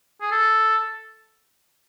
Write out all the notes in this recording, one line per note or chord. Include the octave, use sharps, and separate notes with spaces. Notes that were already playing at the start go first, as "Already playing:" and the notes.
G#4
A4